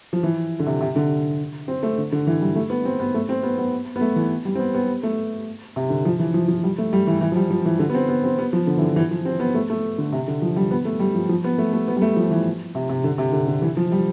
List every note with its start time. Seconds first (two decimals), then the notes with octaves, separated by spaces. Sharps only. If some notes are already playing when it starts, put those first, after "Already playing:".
0.13 F3
0.23 E3
0.60 D3
0.67 C3
0.81 C3
0.96 D3
1.68 C4
1.83 A3
1.98 D3
2.12 D3
2.27 E3
2.41 G3
2.56 A3
2.70 B3
2.85 C4
3.00 B3
3.14 A3
3.29 C4
3.43 B3
3.58 B3
3.96 B3
4.01 A3
4.16 E3
4.45 G3
4.55 C4
4.59 B3
4.74 B3
5.03 A3
5.76 C3
5.90 D3
6.05 F3
6.19 E3
6.34 F3
6.48 F3
6.64 G3
6.78 A3
6.93 G3
7.07 E3
7.21 E3
7.32 F3
7.36 G3
7.51 F3
7.65 E3
7.79 D3
7.90 B3
7.94 C4
8.09 B3
8.24 C4
8.39 B3
8.53 F3
8.67 D3
8.78 E3
8.82 D3
8.96 E3
9.11 F3
9.25 C4
9.40 B3
9.54 A3
9.70 A3
9.98 D3
10.13 C3
10.28 D3
10.42 F3
10.56 G3
10.71 B3
10.85 A3
11.00 G3
11.14 F3
11.29 F3
11.44 B3
11.58 A3
11.73 A3
11.88 B3
11.96 G3
12.02 A3
12.16 F3
12.31 E3
12.75 C3
12.89 C3
13.04 D3
13.18 C3
13.33 D3
13.48 D3
13.62 E3
13.77 F3
13.92 G3